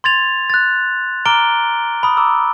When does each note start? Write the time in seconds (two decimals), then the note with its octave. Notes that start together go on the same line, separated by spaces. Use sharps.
0.04 C6 G#6 A6 F7
0.50 F#6 A6
1.26 A#5 D6 F6 D7 G7
2.03 B5 D#6
2.17 A#5 D6 E6